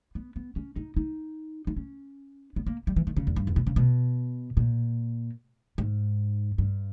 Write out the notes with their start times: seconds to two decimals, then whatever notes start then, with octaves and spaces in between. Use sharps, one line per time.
0.15 B3
0.36 B3
0.56 C#4
0.76 D#4
0.97 D#4
1.67 D#4
1.77 C#4
2.56 B3
2.66 A#3
2.87 G3
2.96 E3
3.07 D#3
3.16 C#3
3.27 E2
3.36 G2
3.47 E2
3.56 B2
3.67 C#3
3.76 B2
4.57 A#2
5.78 G#2
6.58 G2